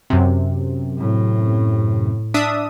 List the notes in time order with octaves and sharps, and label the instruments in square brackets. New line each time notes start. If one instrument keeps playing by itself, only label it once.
[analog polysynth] F#2 C3
[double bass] A2
[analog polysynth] D4 E5 D#6